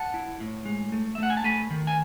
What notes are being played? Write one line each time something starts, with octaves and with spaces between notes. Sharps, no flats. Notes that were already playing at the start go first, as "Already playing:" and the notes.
Already playing: F#5 A5
E4
A2
G#3
A3
E5
A3 F#5
G#5
A5
A3 G#5 B5
D#3
G#5